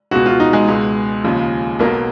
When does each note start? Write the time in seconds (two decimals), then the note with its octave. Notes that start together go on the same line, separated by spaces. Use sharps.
0.11 C#2 B2 F#4
0.26 F4
0.40 D#4
0.53 G#3
0.68 C#2 B2
1.24 D#2 C#3 F3
1.79 B1 B2 A#3